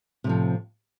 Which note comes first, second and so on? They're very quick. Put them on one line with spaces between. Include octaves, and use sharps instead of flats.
C3 A2 F3